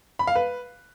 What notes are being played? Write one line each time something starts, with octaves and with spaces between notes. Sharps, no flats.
B5
F5
B4